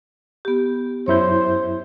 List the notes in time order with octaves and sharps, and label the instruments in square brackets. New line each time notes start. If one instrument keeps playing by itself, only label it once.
[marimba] B3 G4
[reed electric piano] F#2 E4 G6 [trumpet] C5 [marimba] C#5